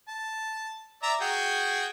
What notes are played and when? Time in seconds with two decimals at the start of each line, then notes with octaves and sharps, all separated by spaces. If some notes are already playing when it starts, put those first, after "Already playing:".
0.08 A5
1.03 D5 E5 A#5
1.21 F#4 G#4 G5